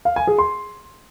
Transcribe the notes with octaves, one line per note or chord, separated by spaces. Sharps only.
F5
G#5
G#4
C6